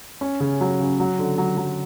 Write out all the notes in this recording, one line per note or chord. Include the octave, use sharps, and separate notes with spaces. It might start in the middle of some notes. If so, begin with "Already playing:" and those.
C#4
C#3
F#3
C#3
F#3
D3
F#3
F#3